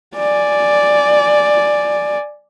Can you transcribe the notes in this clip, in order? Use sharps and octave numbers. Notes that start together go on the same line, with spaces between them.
D5 G#5